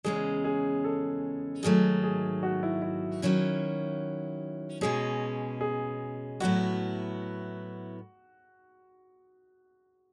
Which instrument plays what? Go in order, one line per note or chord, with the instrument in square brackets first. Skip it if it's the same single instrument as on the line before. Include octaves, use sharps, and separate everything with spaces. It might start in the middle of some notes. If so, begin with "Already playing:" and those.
[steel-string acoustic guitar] E2 C#3 G#3 C#4 [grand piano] G#4
[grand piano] G#4
A4
[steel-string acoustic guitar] G#2 D#3 F#3 A3 [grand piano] G#4
[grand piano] G#4
F#4
E4
E4
[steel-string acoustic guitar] D#3 F#3 C#4 E4
[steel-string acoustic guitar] B2 G#3 C#4 [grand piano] G#4
[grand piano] G#4
[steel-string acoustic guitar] A2 F#3 B3 E4 [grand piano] F#4